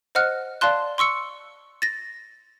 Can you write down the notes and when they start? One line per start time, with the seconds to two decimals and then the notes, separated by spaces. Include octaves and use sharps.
0.15 C5 D#5 F#5 F6 F#6
0.61 D5 F5 A5 C6 F#6
0.98 C6 C#6 E6 C#7
1.82 A6 A#6